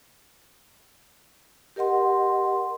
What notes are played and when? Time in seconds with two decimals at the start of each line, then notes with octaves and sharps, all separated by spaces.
1.76 G4 A#4 D#5 F#5 C6